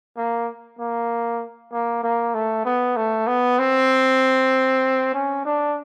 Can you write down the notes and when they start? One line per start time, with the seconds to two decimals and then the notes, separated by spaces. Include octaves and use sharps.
0.17 A#3
0.79 A#3
1.72 A#3
2.03 A#3
2.34 A3
2.65 B3
2.96 A3
3.27 B3
3.59 C4
5.14 C#4
5.45 D4